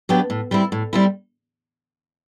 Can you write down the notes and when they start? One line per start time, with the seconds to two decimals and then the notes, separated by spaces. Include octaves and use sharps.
0.09 F#3 B3 D4 G4
0.30 A2
0.51 G3 C4 E4
0.72 A2
0.93 G3 C4 E4